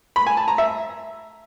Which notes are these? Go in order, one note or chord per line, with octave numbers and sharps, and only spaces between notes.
B5
G#5
A5
A#5
E5